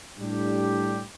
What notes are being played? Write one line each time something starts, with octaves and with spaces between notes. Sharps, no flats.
A2 G3 D4 G4